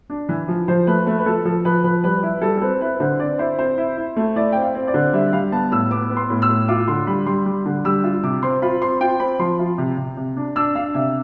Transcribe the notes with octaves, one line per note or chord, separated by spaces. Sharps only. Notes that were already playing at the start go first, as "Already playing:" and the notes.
D4
E3
F3
F3 C5
A3 B4
A3 B4
B4
F3 A4
F3 A4
F3 B4
F3 B4
G3 B4
E4 B4
G3 A4
A4
C4 B4
E4 B4
D3 C5
C4 D5
E4 C5
C4 C5
E4
E4
A3
E4 D5
C4 G5
F5
C4
D5
D3
G3 E5
G3 F5
B3 A5
A2 E6
B3 D6
B3
C6
A2
E6
A2
F4 D6
D6
D3 C6
G3 B5
G3 C6
G3
D3
G3 E6
F4
C3 D6
C4 C6
F4 B5
C4 C6
F4 G5
C4 B5
F3 C6
F4
C3
C3
C3
D4
D4 E6
D4 F5
C3 E5